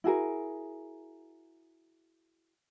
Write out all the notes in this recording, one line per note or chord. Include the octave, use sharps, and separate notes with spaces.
E4 F#4 G#4 A#4